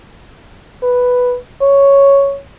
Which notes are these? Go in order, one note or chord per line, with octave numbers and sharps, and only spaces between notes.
B4
C#5